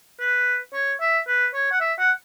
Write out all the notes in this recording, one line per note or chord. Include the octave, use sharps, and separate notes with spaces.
B4
C#5
E5
B4
C#5
F#5
E5
F#5